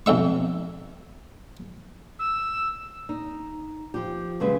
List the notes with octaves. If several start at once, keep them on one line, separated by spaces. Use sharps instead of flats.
B1 F2 E5 C#6
E6
D#4
F3 G4
F#2 C#3 G#3 B4 E5